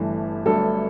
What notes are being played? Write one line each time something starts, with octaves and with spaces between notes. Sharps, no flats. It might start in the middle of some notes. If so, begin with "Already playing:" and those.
Already playing: G1 G2 E3 A3
G1 G2 F#3 A3 A4